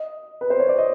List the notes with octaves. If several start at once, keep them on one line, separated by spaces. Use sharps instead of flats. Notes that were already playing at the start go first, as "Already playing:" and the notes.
Already playing: D#5
B4
C5
C#5
D5
D#5